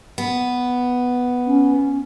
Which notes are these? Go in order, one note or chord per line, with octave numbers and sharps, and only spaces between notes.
B3
C#4